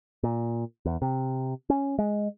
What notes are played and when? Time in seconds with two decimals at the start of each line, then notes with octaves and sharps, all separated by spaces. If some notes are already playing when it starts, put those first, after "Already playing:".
0.23 A#2
0.86 E2
1.02 C3
1.70 C#4
1.99 G#3